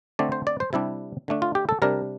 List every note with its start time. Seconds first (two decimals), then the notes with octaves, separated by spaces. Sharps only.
0.19 D3 A3 C4 D5
0.32 C5
0.47 D5
0.60 C5
0.73 C3 G3 D4 E4
1.28 D3 A3 D4
1.42 F4
1.55 G4
1.69 A4
1.82 C3 G3 D4 A#4